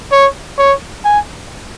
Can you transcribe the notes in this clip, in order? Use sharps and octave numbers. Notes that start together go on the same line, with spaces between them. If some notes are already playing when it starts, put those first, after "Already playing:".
C#5
C#5
G#5